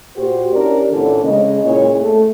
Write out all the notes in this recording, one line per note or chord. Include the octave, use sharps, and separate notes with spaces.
A#2 F#4 G4 C5
C#4 D4 E4 G4 A#4 D5
A#2 D3 E3 C4 C#4 A4
C#3 G#3 D#5
A#2 C#4 E4 G#4 C#5
A3